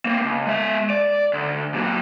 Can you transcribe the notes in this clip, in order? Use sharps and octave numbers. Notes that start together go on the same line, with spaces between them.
A#3 C4
C#2
G#3 E5
D5
D2
A#2 F#3